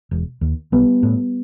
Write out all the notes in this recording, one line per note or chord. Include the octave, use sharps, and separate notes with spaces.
E1
D#2
B1 G3 B3
A2